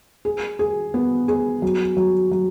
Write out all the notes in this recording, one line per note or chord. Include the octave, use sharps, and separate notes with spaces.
G#4
G#4
B3
G#4
F#3
F#3
F#3